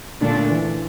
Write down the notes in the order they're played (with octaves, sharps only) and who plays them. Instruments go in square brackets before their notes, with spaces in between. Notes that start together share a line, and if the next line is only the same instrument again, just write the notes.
[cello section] A#2 A3 D4 [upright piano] D3
[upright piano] E3